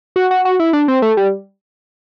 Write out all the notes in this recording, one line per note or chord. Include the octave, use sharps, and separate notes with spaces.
F#4
F#4
F#4
E4
D4
C4
A3
G3